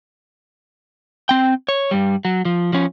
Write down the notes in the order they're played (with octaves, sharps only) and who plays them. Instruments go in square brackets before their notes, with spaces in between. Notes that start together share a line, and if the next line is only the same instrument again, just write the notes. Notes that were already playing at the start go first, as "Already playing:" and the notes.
[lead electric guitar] C4 G5
C#5
G2 G3
F#3
F3
F3 C#4